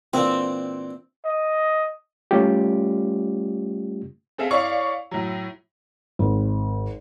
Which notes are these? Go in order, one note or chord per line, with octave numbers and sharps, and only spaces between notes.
A#2 E3 C4 D4
D#5
G3 A3 C#4 F4 G4
C4 G#4 A4 E5 F5
E4 C#5 D5 F5 C#6
A2 F#3
G#1